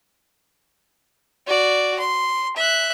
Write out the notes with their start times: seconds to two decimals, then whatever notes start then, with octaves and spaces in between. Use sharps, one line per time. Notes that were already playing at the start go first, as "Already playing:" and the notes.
1.47 F#4 D5
1.99 C6
2.56 E5 F#6